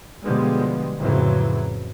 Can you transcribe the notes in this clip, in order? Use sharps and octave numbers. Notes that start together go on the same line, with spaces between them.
B2 D3 F3 G3 G#3 B3
F2 A2 C#3 E3 F#3